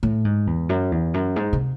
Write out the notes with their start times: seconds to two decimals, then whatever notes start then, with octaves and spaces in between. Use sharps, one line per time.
0.03 A2
0.25 G#2
0.47 E2
0.69 F#2
0.92 E2
1.14 F#2
1.36 G#2
1.53 C3